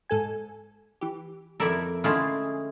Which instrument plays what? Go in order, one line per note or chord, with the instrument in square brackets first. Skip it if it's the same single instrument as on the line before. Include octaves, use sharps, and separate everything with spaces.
[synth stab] G#2 A4 G#5
E3 G4
[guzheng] F2 E4 A#4 [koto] A4 D5 E5
[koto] D3 A3 F4 [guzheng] G#3 C#4 E4